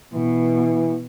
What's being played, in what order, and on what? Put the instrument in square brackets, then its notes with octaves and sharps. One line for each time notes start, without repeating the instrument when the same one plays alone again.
[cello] B2 [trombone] E3